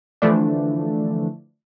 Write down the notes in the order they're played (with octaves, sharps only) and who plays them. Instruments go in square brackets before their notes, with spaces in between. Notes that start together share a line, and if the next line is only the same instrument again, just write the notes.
[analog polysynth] D3 E3 F3 A3 D4